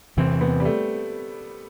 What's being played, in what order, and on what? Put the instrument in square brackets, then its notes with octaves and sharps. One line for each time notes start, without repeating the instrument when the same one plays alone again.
[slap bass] E2 C3 E3 [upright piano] C4
[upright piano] B3
G3
A3